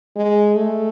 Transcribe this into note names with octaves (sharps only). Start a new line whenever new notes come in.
G#3
A3